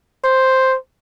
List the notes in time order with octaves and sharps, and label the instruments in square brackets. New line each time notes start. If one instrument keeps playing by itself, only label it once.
[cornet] C5